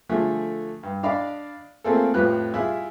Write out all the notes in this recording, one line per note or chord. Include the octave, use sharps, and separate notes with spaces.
D3 F3 A3 G#4
G2
D4 D5 D#5 F5 B5
A3 A#3 C4 F4 G#4 A4
F2 A2 F3 G4 B4 F#6
E4 F4 G4 G#4 E5